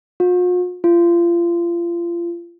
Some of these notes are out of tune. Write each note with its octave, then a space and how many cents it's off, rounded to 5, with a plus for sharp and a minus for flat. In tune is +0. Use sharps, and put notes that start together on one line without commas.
F4 +45
F4 -30